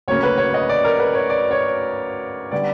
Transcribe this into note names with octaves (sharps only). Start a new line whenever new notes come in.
D2 C#3 F#3 A#3 C#5
B4
C#5
D#5
D5
A#4
B4
C#5
D5
C#5
D3 G3 B3 D5